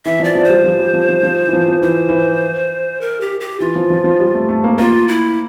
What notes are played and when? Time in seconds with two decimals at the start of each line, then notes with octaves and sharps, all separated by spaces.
0.05 E3 E5
0.20 F3 D5
0.35 F3
0.44 G3 C5
0.64 F3
0.79 G3
0.94 F3
1.09 F3
1.23 F3
1.47 E3
1.53 F3
1.68 F3
1.82 E3 C5
2.09 E3
3.01 A#4
3.21 G4
3.40 G4
3.60 E3 F4
3.75 F3
3.90 F3
4.04 F3
4.20 G3
4.34 A3
4.49 A3
4.64 A#3
4.78 A#3 F4
5.08 E4